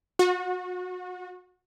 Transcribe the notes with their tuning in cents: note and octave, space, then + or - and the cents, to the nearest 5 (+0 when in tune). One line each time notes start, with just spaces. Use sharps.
F#4 -30